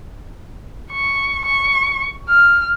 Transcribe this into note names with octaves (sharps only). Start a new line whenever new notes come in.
C#6
C#6
F6